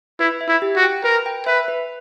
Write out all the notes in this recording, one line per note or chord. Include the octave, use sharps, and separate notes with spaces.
E4 B4
E5
E4
G4
F#4
G5
A#4 B4
G5
B4 E5
B4